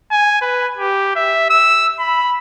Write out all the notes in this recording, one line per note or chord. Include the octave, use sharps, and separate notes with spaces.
G#5
B4
G4
E5
E6
B5